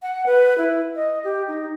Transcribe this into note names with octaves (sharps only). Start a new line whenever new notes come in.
F#5
B4
E4
D#5
G4
D#4